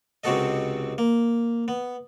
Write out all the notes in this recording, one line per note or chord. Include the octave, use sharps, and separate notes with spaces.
C#2 C3 C4 F#4 A4 D#5
A#3
B3